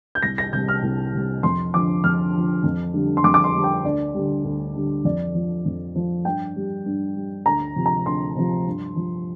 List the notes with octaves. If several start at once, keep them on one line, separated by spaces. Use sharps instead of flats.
G6
C2 A#6
A#6
C3 G3 G6
F6
C2
C3 G3
F2 C6
D3 F3 D6
F2 F6
D3 F3
F2
D3 G3
C6
F2 D6
D6
C6
D3 G3
G5
D2 D5
D3 G3
D2
D3 G3
F2 D5
F3
F2
F3
G2 G5
G3
G2
G3
D2 A#5
C3 F3
A#5
D2 C6
C3 F3
G2
F3